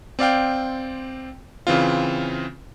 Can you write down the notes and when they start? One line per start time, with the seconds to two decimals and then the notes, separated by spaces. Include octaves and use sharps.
0.19 C4 D5 F5 G5
1.67 C#3 E3 C4 F4